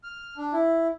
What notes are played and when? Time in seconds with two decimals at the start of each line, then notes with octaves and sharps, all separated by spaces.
0.04 F6
0.37 D4
0.53 E4